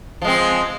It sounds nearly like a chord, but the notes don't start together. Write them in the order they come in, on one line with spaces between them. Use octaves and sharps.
F3 G#3 C4